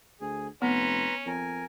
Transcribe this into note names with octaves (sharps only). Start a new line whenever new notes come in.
D2 G#4
F1 B3 C#4 B4 A#5 C6
F2 A#4 G#5